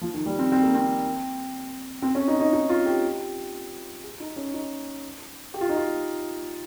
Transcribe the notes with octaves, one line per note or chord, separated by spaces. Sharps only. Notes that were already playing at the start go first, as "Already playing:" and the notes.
F3
D#3
G3
C4
C4
A#3
C4
C4
C#4
D#4
D#4
D#4
F4
G4
G#4
D#4
C#4
D#4
G4
F4
D#4
F4